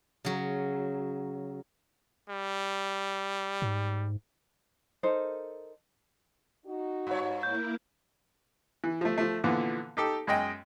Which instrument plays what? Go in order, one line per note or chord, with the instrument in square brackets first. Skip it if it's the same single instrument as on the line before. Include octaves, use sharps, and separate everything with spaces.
[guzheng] C#3 F#3
[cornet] G3
[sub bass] G#2
[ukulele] D#4 A4 A#4 C5
[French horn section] D#4 F#4
[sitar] G2 C#5
[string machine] A#3 E4 A#4 [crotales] G6
[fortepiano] E3
F3 A3
F3 A3
A#2 D3 E3 F3 B3
D#4 G4 A4
F#2 G#3 D#5 G5